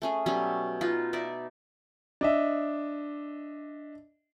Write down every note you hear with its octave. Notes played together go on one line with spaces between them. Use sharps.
A3 C#4 G#4
B2 F#3 G3 C#4
D#4 F4 B4
D#4 D5 E5
D4 D#5 E5